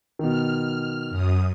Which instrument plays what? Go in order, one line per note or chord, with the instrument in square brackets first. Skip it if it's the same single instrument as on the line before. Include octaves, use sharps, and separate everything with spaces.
[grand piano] B2 D#3 [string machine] F6
[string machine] F#2 D#6